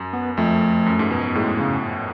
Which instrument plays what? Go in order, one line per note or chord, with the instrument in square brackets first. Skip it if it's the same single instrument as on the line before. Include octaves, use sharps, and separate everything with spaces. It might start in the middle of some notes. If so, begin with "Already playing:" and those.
Already playing: [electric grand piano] F#2
[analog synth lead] B3
[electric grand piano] F2 [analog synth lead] A3
[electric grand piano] F#2
G#2
B2
B2
[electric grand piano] A2 [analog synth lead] G#3
[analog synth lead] C#3